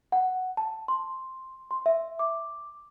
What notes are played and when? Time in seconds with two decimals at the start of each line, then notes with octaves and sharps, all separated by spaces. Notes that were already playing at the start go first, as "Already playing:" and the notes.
0.12 F#5
0.57 A5
0.88 C6
1.71 C6
1.86 E5
2.19 D6